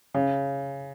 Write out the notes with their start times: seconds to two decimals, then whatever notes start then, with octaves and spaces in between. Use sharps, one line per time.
0.14 C#3